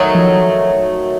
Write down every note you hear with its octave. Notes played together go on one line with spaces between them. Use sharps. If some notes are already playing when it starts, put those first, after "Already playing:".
Already playing: D#3 F#3 A3
F3